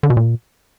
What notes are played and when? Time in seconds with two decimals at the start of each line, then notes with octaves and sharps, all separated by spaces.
0.03 D3
0.10 B2
0.17 A#2